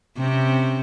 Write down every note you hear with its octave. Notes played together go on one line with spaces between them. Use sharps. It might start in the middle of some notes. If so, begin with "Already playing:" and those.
C3 C4 C#4